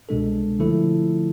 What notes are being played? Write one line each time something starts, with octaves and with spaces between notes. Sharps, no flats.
C2 B2 G#3 D4 A4
D3 F3 A3 E4 A4